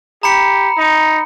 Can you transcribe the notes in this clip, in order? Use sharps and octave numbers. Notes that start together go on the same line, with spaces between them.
G4 A#5 B5 C#7
D#4